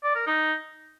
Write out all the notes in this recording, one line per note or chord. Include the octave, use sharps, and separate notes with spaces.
D5
A#4
D#4